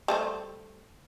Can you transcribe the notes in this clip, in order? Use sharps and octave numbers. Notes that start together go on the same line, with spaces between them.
G3 A3 C5